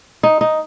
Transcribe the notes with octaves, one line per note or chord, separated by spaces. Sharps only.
D#4
D#4